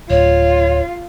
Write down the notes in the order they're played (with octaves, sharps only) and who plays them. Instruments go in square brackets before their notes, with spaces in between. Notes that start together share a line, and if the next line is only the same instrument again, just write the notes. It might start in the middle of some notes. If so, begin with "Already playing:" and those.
[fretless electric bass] D1 [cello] F4 [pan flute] C#5